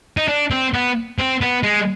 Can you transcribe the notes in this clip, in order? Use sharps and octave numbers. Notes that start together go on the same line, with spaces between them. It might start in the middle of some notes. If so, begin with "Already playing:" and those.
D#4
D4
C4
B3
C4
B3
G#3